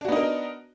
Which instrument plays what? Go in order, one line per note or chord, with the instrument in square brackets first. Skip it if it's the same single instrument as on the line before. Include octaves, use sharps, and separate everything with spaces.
[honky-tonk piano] D4
F#4
B3
D#4
A#4